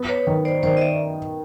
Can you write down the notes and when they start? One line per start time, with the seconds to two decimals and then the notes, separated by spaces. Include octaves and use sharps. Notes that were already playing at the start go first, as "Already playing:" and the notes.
Already playing: B3
0.09 B4 C#5
0.27 D#3
0.45 C5 D5
0.63 D#3 C5 D5
0.77 D#5
0.81 D5 E5